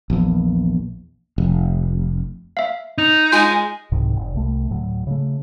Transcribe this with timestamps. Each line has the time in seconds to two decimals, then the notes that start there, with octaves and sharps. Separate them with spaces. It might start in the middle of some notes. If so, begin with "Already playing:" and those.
0.10 A#1 E2
1.38 F1
2.57 E5 F5
2.98 D#4
3.32 G#3 F4 G#5
3.92 C2 G#2 C3 D#3
4.16 F1
4.34 C2 A3
4.70 D2 A2 F#3
5.07 C#3 A3